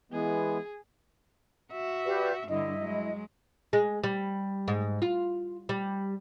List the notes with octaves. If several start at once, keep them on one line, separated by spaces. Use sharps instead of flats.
E3 G#3 B3 G#4
F#4 E5
G4 B4 D5
G2 D3 E4 D#5
F#3 G#3
G#3
G3
G#2
F4
G3